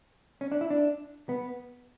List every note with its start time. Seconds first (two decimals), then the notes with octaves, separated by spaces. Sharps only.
0.41 C#4
0.52 D4
0.61 E4
0.70 D4
1.29 B3